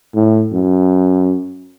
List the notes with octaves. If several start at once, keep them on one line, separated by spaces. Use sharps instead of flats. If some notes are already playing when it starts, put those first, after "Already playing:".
A2
F#2